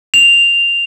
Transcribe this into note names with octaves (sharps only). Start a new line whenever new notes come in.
F7